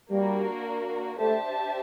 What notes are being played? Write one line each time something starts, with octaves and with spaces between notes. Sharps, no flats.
G3 A#3 D4 F#4 A#4
A3 D4 G4 C5 E5 A5